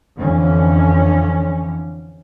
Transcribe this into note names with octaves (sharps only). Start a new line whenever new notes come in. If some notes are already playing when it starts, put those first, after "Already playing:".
F2 D3 E3 C#4